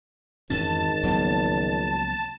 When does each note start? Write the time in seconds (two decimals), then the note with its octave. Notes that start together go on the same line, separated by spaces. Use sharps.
0.50 G#1 F2 E3 C#4 A5
1.03 C#2 C#3 F3 F#3 A#3 B3